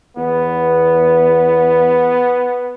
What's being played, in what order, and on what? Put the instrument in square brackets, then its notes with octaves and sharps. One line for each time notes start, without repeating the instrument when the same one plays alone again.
[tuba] E2 [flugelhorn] B3